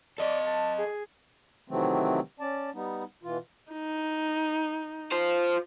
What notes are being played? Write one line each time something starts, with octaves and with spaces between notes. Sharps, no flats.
A4 D5 D#5
A5
G#4
C3 D#3 E3 F#3 A3 C4
C#4 D5 A5
G3 B3 D#4
B2 E3 F4
D#4
F4 C5